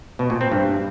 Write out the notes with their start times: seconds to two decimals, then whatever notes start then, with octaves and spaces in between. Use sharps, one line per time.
0.19 B2
0.30 A#2
0.41 C4
0.51 G2